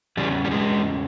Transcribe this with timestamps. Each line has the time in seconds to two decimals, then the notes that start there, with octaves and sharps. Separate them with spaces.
0.17 E2 C#3 G3
0.45 G3
0.51 G#3